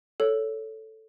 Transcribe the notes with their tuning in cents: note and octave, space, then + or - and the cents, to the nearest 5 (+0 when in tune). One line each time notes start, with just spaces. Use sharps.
A4 +0 C#5 +10